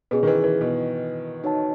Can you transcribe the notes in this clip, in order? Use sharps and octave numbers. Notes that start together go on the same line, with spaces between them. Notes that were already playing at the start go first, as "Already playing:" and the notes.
B2 C#4 G#4 B4
D#3
E3
E3
B2
D#4 F#4 C#5 F#5 A5